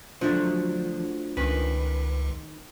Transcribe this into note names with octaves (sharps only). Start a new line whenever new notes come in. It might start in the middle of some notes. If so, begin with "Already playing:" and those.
D3 F3 F#3 A3 D4 F4 C5
C#2 D#3 C#4 B4